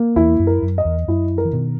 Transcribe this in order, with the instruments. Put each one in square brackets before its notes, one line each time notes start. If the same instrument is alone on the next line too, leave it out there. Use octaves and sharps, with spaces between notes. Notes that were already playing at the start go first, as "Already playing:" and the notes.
Already playing: [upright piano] A#3
[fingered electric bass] E2 [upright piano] E4
[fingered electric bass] F#2
[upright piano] A#4
[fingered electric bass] F#2
[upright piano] D#5
[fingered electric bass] E2
[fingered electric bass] F#2 [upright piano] E4
[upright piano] A#4
[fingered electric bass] E3
B2 D#3